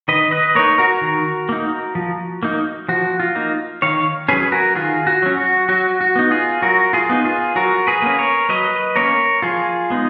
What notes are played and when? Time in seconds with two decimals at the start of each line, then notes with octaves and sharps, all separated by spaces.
0.08 D#3 B4 D#5
0.31 B4 D#5
0.55 A#3 D#4 A#4 C#5
0.78 F#4 A#4
1.01 D#3
1.49 A#3 D#4
1.95 F3
2.43 A#3 D#4
2.88 F3 F#4
3.20 F4
3.35 A#3 D#4
3.82 D#3 C#5 F5
4.28 F#3 C#4 G#4 B4
4.52 F#4 A#4
4.75 D#3 F4 G#4
5.07 F#4
5.22 F#3 C#4
5.38 F#4
5.69 F#3 F#4
6.01 F#4
6.16 B3 D#4
6.31 F4 G#4
6.62 F#3 F#4 A#4
6.93 F4 G#4
7.09 B3 D#4
7.25 F4 G#4
7.55 F#3 F#4 A#4
7.87 G#4 B4
8.02 A#3 C#4
8.19 A#4 C#5
8.49 F#3 B4 D#5
8.96 A#3 C#4 A#4 C#5
9.42 F3 F4 G#4
9.90 G#3 B3 D#4